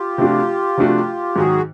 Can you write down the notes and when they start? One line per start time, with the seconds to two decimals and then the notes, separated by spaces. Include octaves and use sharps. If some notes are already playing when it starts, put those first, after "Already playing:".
Already playing: F4 G4
0.18 C3 F3 A3 D4 F#4
0.78 C3 F3 A3 D4 F#4
1.36 G#2 D#3 F#3 F#4 G#4